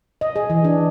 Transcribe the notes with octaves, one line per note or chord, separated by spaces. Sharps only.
D#5
G#4
E3
D4